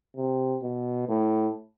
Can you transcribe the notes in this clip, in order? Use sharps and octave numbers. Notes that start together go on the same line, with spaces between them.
C3
B2
A2